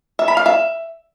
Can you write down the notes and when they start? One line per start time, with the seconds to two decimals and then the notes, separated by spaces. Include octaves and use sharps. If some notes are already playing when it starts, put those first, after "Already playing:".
0.19 E5
0.28 B5
0.37 F5
0.46 E5